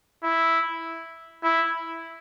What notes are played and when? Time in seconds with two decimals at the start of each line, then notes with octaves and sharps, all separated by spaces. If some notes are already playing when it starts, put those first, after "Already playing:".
0.24 E4
1.43 E4